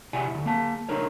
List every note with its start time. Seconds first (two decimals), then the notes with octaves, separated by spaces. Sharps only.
0.13 C3 E4 G4 D5 F#5 G#5
0.31 D2 G#2
0.46 A#3 A5
0.89 D4 D#4 A#4 C#5